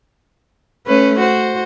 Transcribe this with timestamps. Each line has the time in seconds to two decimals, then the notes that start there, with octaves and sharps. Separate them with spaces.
0.86 A3 C#4 B4
1.20 F#4 C5